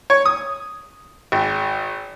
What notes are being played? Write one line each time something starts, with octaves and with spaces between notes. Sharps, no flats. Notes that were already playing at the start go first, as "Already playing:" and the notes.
C#5
D#6
G#1